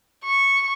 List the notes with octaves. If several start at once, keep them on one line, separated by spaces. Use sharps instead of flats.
C#6